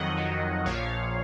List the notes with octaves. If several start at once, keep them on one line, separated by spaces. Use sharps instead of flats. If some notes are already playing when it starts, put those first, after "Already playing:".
Already playing: F2 D#3 F#3 D#5 F#5
F2 D#3 F#3
A#1 A#2 F3 C#5 F5